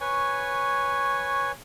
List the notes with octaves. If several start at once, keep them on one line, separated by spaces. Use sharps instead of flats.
B4 C#5 G#5 C#6